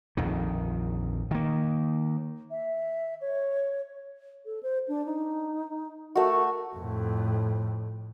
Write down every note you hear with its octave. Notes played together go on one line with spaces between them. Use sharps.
A#1 F2 D#3
D#3 A#3
E5
C#5
A4
C5
D4
D#4
A3 F#4 A#4
F2 A2